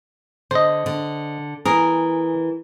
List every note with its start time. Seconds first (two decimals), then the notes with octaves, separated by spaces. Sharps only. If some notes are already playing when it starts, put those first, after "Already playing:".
0.51 D3 C5 D#5
0.86 D3
1.65 E3 G#4 A#4